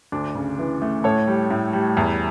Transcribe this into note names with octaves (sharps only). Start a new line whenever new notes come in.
D2 D4
C#3
E3
A3
A2 A4 C#5
G3
A2
G3
E2